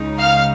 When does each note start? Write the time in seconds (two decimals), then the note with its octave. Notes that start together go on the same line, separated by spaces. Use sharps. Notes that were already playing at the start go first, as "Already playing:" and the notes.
Already playing: C#2 C#3 G#3 D#4
0.19 F5 F6